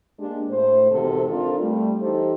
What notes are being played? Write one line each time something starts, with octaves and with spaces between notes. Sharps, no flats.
G#3 A#3 D4 G4
A2 C5
E2 G#2 C3 D#3 F#4 A4
C4 D4 F4 A4 A#4
G3 A3
E3 D#4 G4 A4 C5